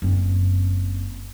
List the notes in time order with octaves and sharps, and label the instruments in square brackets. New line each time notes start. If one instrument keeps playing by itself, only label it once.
[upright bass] F#1 C4